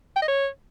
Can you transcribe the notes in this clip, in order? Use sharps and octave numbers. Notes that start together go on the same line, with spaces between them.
G5
D#5
C#5